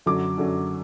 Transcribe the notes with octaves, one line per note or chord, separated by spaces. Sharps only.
F#2 D3 F#3 D6
F#2 D3 F#3